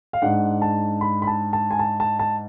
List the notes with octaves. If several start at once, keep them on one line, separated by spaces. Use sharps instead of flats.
F5
G#2 G#3 D4 F#5
A5
B5
B5
A5
A5
G#5
A5
A5
A5